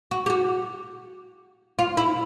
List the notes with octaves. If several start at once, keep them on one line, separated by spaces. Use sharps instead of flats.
F#4
G4
F#4
F4
E4